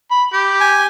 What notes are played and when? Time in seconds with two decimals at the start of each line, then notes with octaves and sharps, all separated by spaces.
0.11 B5
0.33 G4
0.61 G#5